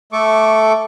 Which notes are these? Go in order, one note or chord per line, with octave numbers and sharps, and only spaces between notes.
A3 A4 C#6 D6